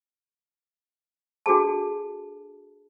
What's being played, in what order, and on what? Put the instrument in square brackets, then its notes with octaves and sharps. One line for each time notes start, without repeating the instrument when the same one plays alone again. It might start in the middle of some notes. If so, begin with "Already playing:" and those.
[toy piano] D4 F#4 G#4 A4 A5